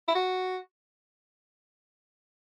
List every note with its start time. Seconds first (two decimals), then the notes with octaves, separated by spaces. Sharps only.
0.08 E4
0.15 F#4